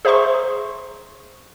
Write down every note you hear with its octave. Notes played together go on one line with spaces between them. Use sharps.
G#4 C5 E5 A#5 C6 C#6